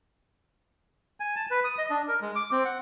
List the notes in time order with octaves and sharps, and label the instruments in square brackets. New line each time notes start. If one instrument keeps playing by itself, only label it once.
[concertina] G#5
A5
B4
D#6
D#5
D4
A#4
G#3
D6
C4
F#5